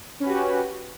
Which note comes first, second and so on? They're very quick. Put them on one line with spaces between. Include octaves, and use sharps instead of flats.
C#4 B4 F#4 G4